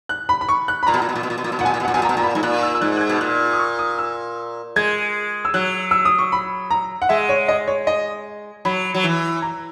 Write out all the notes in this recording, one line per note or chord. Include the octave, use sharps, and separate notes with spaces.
F#6
B5
B5
C#6
F#6
B5
A#2 A#5
B2
A#2
B2
A#2
B2
A#2
B2
A#2
B2
A#2 F#5
B2 G#5
A#2
B2
F#5
A#2
B2 G#5
A#2 A#5
B2
A#2 A#5
B5
G#2
A#2 F#6
E6
E6
G#2 F#6
F#6
G#6
B2
A#2 F#6
D#6
C#6
D#6
E6
G#3 G#6
E6
F#3 F#6
E6
D#6
C#6
B5
A#5
F#5
G#3 E5
C#5
D#5
C#5
D#5
F#3 B5
F#3
E3
A#5